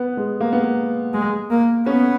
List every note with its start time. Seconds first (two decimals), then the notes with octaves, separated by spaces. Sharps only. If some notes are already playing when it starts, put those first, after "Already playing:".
Already playing: B3
0.17 G#3
0.41 A#3
0.53 B3
0.63 A#3
1.14 G#3
1.50 A#3
1.86 B3 C#4